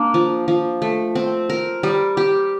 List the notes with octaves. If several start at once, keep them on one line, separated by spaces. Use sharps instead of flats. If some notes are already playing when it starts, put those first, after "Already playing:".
Already playing: A#3 D4
F3
F3
A3
C4
A#4
G3
G4